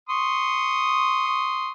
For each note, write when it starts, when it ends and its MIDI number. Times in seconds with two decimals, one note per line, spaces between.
0.09 1.71 84
0.09 1.71 85
0.09 1.71 87